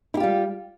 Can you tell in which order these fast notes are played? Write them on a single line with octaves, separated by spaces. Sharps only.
E4 G4 F4 G3